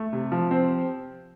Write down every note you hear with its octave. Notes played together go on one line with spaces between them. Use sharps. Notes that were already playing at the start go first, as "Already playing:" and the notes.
Already playing: A3
C3
F3
C4